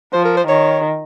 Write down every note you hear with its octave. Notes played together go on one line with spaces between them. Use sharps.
F3 C5
A#4
C5
D#3 C#5